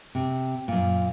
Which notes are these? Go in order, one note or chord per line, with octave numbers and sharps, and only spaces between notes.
C3
F#2 A#2